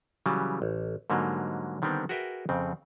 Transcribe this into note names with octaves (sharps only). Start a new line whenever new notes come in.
C#3 E3 F#3 G3
A1
G#2 D3 F#3 G3 A#3
D3 D#3 G3 B3 C4
F#4 G#4 A#4 B4 E5 G5
F2 C#3 C4